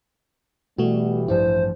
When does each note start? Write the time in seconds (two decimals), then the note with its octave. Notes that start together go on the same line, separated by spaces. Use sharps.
0.78 B2 E3 G3 A3 F#4
1.28 A1 G2 F3 E4 C5